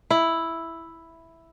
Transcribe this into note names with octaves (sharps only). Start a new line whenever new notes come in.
E4